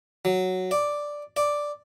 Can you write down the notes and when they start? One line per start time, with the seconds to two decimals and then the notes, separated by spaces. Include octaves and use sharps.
0.25 F#3
0.71 D5
1.37 D5